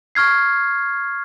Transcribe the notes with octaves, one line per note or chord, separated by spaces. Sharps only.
C#6 F6 G#6 C7